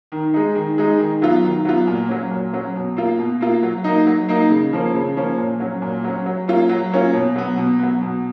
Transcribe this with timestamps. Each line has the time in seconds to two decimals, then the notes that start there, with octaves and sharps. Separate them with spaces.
0.12 D#3
0.34 G#3 D#4
0.55 D#3
0.78 G#3 D#4
0.99 D#3
1.22 F#3 B3 F4
1.44 D#3
1.65 F#3 B3 F4
1.87 A#2
2.09 F#3 C#4
2.31 A#2
2.53 F#3 C#4
2.75 B2
2.97 A#3 F4
3.19 B2
3.41 A#3 F4
3.63 F#3
3.84 A#3 D#4
4.07 F#3
4.29 A#3 D#4
4.50 C#3
4.73 F3 A#3 C#4
4.95 C#3
5.16 F3 A#3 C#4
5.38 A#2
5.60 F#3 C#4
5.82 A#2
6.04 F#3 C#4
6.26 F#3
6.48 A#3 C#4 F4
6.69 F#3
6.92 A#3 C#4 F4
7.13 B2
7.36 F#3 B3
7.57 B2
7.79 F#3 B3
8.01 B2